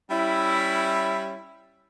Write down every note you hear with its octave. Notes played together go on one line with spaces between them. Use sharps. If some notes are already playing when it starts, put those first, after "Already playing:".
G3 C#4 E4